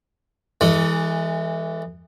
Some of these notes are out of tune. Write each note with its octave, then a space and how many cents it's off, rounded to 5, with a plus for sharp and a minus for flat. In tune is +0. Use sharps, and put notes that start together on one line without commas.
E3 +0 G#3 -25 A4 +25